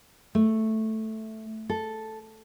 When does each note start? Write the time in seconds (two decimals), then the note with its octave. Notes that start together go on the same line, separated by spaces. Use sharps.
0.35 A3
1.69 A4